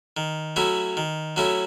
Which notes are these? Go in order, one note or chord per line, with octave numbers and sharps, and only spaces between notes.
D#3
F#3 A3 C#4 E4
D#3
F#3 A3 C#4 E4